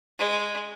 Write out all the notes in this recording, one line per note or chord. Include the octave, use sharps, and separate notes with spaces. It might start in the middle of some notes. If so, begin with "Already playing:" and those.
G#3